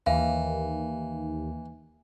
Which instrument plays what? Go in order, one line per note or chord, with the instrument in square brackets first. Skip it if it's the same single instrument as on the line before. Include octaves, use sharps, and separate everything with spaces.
[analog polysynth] D#2 [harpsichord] E3 [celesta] F5